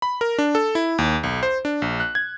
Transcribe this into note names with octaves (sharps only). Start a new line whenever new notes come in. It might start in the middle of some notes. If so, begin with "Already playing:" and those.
B5
A#4
D4
A4
E4
D#2
B1
C5
D4
A#1
F#6
G#6